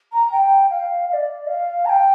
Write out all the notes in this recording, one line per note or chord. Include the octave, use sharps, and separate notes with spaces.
A#5
G5
F5
F5
D5
F5
A#5
G5